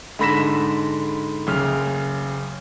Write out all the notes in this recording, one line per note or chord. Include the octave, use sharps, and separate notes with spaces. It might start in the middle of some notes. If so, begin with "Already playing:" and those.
G#2 D3 B5 A#6 B6 E7
F#1 C#3 F6